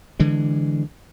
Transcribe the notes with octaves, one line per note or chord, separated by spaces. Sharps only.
D3 E3 G#3